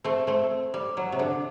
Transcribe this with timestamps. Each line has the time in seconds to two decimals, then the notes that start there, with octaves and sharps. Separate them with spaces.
0.04 A3 C4
0.27 A3 C4
0.74 G3
0.97 F#3
1.12 C3
1.19 D3